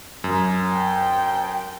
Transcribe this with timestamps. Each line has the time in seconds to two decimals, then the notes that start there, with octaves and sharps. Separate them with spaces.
0.24 F#2
0.70 G5